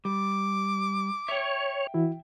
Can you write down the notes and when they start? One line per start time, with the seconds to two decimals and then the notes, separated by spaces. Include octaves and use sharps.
0.05 G3 D6
1.28 C#5 E5 G5
1.94 E3 E4 F#4